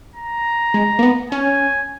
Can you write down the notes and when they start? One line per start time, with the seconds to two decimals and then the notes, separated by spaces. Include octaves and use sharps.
0.16 A#5
0.74 G#3
0.99 A#3
1.03 B3
1.32 C#4 G#5